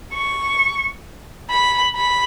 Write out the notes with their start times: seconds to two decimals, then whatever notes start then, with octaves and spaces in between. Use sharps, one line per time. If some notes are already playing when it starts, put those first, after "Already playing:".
0.13 C#6
1.50 B5
1.96 B5